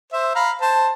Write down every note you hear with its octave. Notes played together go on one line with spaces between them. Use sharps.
C5 E5
F5 A#5 B5
C5 A5